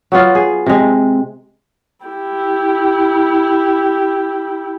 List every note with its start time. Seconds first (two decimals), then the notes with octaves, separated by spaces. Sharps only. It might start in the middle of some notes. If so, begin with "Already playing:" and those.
0.12 F#3 B3 F4
0.35 G#4
0.66 C3 G#3
2.05 E4 G4